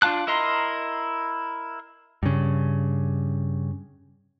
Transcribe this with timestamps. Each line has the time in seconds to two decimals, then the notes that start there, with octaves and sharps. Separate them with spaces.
0.02 D4 F4 F5 A5 F#6
0.27 E4 A#4 D#5 A#5 C6
2.23 G2 C#3